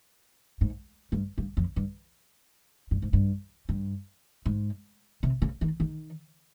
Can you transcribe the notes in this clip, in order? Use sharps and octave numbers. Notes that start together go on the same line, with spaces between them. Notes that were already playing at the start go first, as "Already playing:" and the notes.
G#2
G2
G2
F2
G2
G2
G#2
G2
G2
G#2
C3
C#3
D#3
D#3